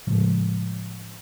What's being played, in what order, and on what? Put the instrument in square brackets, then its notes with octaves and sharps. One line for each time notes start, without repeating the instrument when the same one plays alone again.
[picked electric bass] A2 C#3 F3 G#3